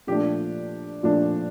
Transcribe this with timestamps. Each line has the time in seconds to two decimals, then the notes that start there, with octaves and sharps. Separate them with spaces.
0.07 A#2 F3 A3 D4 G4
1.03 A#2 F3 A3 D4